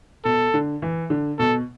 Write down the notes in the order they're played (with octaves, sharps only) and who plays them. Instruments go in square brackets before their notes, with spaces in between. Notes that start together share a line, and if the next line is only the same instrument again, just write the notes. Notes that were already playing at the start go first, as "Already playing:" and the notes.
[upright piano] B2 [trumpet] A4
[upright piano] D3
E3
D3
[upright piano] B2 [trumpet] A4